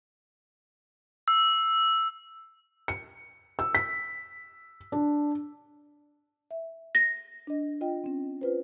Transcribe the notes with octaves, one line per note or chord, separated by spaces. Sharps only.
E6
C#7
E6
B6
D4
E5
A#6
D4 D#5
F4 D#5 G5
C4 C#4
F4 B4 C5